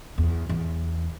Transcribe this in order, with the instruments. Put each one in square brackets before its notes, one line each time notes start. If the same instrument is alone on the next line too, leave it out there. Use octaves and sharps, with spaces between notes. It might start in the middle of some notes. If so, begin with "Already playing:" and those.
[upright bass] E2
E2